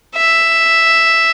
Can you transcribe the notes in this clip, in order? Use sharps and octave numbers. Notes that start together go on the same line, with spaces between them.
E5